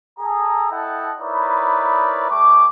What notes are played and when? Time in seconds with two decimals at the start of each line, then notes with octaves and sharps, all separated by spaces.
0.19 G#4 A4 A#5
0.71 E4 A4 D#5 F#5 G5 A5
1.19 D#4 E4 A#4 B4 C#5 D5
2.29 G3 A3 C#6 D6